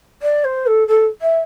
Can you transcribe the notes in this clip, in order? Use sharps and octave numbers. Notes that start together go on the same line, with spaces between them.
D5
C5
A4
A4
E5